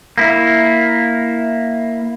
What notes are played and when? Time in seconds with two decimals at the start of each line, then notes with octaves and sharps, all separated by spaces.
0.18 A#3 E4